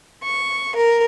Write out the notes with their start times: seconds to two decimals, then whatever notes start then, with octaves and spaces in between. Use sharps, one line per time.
0.23 C#6
0.74 A#4